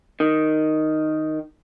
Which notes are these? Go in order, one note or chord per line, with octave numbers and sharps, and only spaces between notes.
D#3